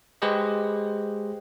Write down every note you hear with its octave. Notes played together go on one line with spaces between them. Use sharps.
G#3 G4 G#4 B4 C5 D#5